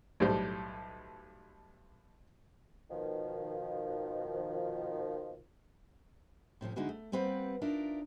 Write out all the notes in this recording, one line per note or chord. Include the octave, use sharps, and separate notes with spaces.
B1 A2 G3 C5
B2 D#3 F3
A2 C3 F3 C#4
D3 G#3 D#4 E4 F#4 G#4
A3
G3 A#3 C4 B4 F#5
D4 D#4 F4 A#4 D5 E5